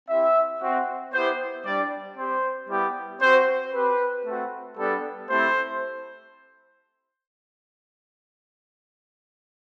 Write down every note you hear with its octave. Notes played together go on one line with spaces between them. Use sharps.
C4 E4 G4 E5
C4 F#4
B3 E4 G4 C5
G3 D4 G4 D5
C4 G4 C5
G3 B3 E4 G4
C4 F#4 C5
C4 G4 B4
A3 C4 F#4
G3 B3 D4 G4 A4
A3 C4 E4 G4 C5